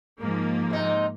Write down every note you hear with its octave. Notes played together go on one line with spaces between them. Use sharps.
G#2 F3 A#3
C3 D#4